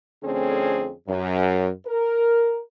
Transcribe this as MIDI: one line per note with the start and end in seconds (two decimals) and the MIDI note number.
0.23 0.91 41
0.23 0.91 50
0.23 0.91 57
0.23 0.91 60
0.23 0.91 61
0.23 0.91 68
1.09 1.69 42
1.87 2.59 70